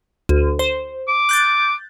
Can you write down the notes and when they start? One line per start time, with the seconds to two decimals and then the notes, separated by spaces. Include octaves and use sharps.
0.29 D2
0.59 C5
1.08 D6
1.29 F#6 G6 A6